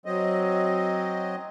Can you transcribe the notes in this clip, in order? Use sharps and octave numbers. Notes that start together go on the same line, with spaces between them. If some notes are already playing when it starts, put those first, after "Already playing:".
F#3 C4 D#5